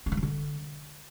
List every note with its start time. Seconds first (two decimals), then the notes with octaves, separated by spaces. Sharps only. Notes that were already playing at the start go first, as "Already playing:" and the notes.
0.06 C#4
0.12 F3
0.17 F#3
0.23 D3